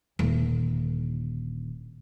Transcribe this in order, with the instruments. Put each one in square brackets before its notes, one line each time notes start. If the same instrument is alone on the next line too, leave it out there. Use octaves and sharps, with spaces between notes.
[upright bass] D#1 D3